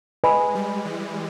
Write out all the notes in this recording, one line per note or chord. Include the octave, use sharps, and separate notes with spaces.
G#3 B4 D#5 G#5 B5
G3
E3